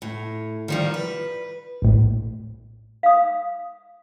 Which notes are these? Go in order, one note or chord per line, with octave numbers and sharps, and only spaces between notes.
A2
D#3 F3 G3
B4
A#1 A2
F5 D#6